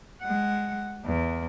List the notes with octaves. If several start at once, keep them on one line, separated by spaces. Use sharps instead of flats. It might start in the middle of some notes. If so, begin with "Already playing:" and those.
G#3 F#5
E2